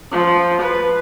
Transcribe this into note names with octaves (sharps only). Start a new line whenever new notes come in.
F3
B4